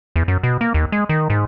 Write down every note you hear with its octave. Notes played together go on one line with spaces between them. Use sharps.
E2
F#2
B2
A#3
D#2
G#3
D#3
G#2